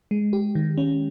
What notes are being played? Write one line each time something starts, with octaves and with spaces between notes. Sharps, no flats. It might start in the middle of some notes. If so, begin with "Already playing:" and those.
G#3
G4
D#3
C#4